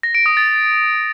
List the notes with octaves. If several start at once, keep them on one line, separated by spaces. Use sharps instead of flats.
A#6
D7
D#6
A6